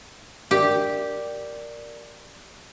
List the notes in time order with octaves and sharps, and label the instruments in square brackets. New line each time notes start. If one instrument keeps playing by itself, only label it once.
[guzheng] G4 [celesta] A#4 D5